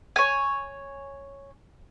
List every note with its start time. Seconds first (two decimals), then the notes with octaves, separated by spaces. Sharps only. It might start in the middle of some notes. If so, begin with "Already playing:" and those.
0.16 C#5 G#5